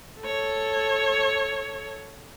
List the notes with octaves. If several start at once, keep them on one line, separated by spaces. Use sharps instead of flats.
A4 C#5